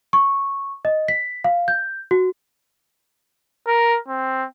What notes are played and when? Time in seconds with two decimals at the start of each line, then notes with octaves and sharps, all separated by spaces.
0.13 C#6
0.85 D#5
1.08 B6
1.44 F5
1.68 G6
2.11 F#4
3.67 A#4
4.08 C4